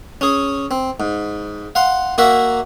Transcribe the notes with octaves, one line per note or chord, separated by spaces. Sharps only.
C#4 G#4
C4
G#2
F5 F#5 C6
A#3 F#4 A#4 E5